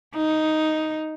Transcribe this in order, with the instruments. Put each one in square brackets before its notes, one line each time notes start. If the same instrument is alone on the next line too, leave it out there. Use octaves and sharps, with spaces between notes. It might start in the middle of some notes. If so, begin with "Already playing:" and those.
[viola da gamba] D#4